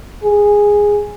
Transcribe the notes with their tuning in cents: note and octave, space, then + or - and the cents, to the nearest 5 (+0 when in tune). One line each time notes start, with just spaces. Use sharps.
G#4 -10